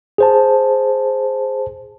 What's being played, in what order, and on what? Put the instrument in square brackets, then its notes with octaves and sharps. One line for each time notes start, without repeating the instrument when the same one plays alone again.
[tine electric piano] G#4 C5 A5